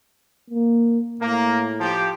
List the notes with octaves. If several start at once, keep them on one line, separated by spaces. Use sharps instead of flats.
A#3
A2 A#3
F3 G4